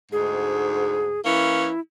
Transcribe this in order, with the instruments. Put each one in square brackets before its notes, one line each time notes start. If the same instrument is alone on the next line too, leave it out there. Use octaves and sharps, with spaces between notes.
[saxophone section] D2 G#2 [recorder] G#4
[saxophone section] E3 A#3 C#4 [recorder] E4